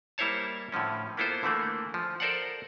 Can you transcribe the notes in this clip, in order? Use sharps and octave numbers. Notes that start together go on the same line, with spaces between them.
G3 A#3 E4 C5 C#5 A5
A2 D3 F3 C#4
A#3 B3 E4 F4 A4 C5
D3 E3 A3 A#3
F3
A4 A#4 C5 D5 F5 F#5